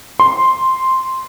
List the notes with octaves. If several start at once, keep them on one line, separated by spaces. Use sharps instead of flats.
C6